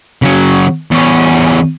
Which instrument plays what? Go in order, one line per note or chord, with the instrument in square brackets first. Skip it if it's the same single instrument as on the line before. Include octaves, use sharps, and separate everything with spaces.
[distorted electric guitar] C#3 F#3
E2 C#4